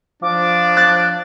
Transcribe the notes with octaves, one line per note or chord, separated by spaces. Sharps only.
F3 D4 D6
F#6 A6